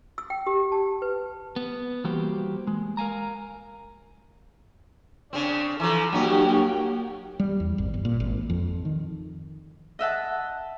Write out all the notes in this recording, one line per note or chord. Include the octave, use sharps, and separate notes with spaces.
E6
G5
G4
A5
B4
B3
E3 G3 A#3 F#4 G4 C5
G#3
A#4 F5 G#5 A#5
C#3 C4 D4
E3 F3 A4 A#5
G2 F#3 A#3 C#4 F#4 G4 G5
G3
E2
G#1
G1
A#2
G#1
F2
D#3
D#5 E5 F#5 A5